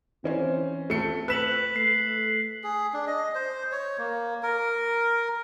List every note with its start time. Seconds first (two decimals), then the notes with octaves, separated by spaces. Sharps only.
0.24 E3 C4 C#4 C5
0.90 A3 C#7
1.28 B4 E6 F#6 B6 E7 F#7
1.76 A3 C7
2.64 G#4
2.93 D4
3.07 D#5
3.35 C5
3.72 C#5
3.98 A#3
4.43 A#4